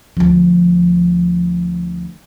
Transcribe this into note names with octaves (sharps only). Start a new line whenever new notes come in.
D2 F3